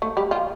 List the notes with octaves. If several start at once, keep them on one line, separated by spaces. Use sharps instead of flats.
A3 A4
G3 G4
F3 F4